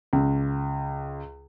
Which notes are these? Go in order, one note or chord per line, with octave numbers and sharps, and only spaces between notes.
C#2